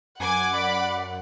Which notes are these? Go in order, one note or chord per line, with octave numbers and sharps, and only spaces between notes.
F#2 F#5 G#5 D6
D5 B5